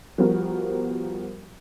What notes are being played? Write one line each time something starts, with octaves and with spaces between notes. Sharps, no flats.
F3 G3 B3 F#4 A#4